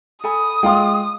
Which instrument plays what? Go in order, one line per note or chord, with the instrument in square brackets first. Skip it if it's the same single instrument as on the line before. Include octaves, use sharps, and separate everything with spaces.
[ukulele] A4 G#5 B5 [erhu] D#6
[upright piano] G#3 F5 C6 [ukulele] F4 G5